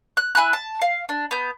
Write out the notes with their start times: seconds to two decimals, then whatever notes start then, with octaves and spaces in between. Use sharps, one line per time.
0.17 F#6
0.35 E4 G#5 B5 F#6
0.53 A5
0.82 F5
1.09 D4
1.31 B3 G6